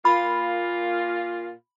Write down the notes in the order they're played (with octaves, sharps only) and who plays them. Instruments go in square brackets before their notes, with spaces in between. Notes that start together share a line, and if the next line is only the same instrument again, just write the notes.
[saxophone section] A#2 A#3 F4 [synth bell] B5